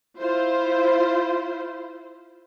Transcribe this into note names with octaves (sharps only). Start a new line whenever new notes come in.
E4 F4 C5